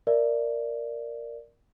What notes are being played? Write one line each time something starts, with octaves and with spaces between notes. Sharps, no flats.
A#4 D5 E5